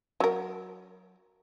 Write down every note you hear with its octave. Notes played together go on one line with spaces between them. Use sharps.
F#3 A#4